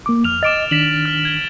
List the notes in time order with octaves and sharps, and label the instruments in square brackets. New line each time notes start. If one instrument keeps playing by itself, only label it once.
[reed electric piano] A#3 D6
[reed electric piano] F2 [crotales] F6 F7
[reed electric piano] D#5 D6 [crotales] A6 D7 E7
[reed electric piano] D#3 D4 [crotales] B6 E7 F#7
[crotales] F6
G#6